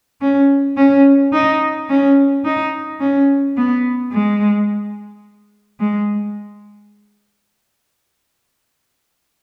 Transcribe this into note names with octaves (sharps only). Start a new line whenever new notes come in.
C#4
C#4
D#4
C#4
D#4
C#4
B3
G#3
G#3